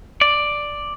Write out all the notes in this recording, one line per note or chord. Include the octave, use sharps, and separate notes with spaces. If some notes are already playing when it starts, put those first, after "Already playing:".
D5